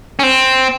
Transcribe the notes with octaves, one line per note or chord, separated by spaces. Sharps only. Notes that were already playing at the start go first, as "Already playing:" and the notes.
C#4
C4